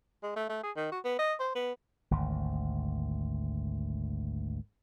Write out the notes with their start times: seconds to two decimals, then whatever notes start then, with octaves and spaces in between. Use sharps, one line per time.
0.23 G#3
0.36 A3
0.49 A3
0.63 G#4
0.76 D#3
0.92 F#4
1.05 B3
1.19 D#5
1.39 C5
1.55 B3
2.11 G#1 D2